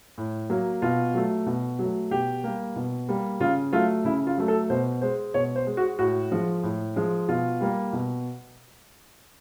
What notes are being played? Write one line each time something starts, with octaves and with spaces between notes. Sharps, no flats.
A2
F#3 A#3
B2 F4
F#3 A3
B2
F#3 A3
B2 G4
G3 A#3
B2
G3 A#3
C#3 F4
F#3 A3 F4
C#3 E4
F4
F#3 A3
A4
B2 C5
G#3 C5
B2 C#5
C5
G#3
F#4
A2 F#4
F3 G#3
A2
F3 G#3
B2 F4
G3 A#3
B2